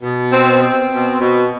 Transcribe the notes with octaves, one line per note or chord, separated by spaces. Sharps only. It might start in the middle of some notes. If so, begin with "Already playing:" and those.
B2
C4
C4
B2
B2